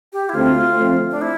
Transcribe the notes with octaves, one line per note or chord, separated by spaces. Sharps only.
G4
E4
D2 D3 A3 C4 F4
F3 A3 C4
D4
E4